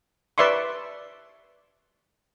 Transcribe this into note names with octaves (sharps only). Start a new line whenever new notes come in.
B4 D5 E5 C6 C#6